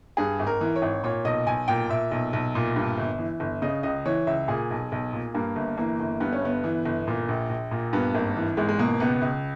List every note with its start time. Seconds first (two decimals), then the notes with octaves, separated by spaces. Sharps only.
0.17 G2 G#4
0.39 G#1
0.47 A#4
0.61 E3
0.76 C#5
0.82 G#1
1.04 A#2 C#5
1.25 B1 D#5
1.47 B1 G#5
1.68 A#2 G5
1.90 A#2 E5
2.11 B1
2.33 B1
2.55 A#2
2.76 G2
2.98 G1
3.19 E3
3.40 G1
3.62 C#3 D#5
3.83 C#2 D#5
4.06 E3 C#5
4.27 C#2 E5
4.48 A#2 G#4
4.71 B1
4.92 B1
5.13 A#2
5.35 G2 A#3
5.56 G1
5.78 E3 A#3
6.00 G1
6.20 G2 B3
6.33 C#4
6.42 G1 B3
6.64 E3
6.85 G1
7.07 A#2
7.29 A#1
7.49 A#1
7.71 A#2
7.93 G2 B3
8.15 G#1 A#3
8.37 E3
8.57 G#1 G#3
8.69 G#3
8.79 B2 A#3
9.00 C#2 B3
9.22 C#2